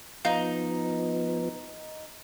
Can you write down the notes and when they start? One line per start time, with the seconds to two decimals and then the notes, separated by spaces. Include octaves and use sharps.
0.25 F3 B3 D#4 F5